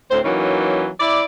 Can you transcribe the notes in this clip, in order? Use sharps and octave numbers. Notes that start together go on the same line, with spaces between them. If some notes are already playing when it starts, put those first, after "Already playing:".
D2 A2 C4 C5
E3 F#3 A#3 C#4 D#4
E4 D5